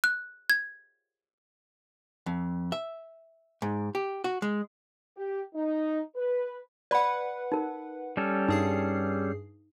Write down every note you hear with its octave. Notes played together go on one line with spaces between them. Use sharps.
F#6
G#6
F2
E5
G#2
G4
F#4
G#3
G4
D#4
B4
B4 D5 F#5 B5
D#4 A#4
G3 C#4 A4
G2 D#4 G#4 C7